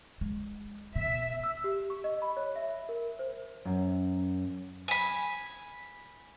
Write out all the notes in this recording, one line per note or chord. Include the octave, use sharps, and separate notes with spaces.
G#3
B2 E5
E6
G4
C#6
D#5
B5
C#5
E5
A#4
C5
F#2
G#5 B5